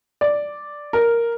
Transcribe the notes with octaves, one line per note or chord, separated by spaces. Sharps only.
D5
A#4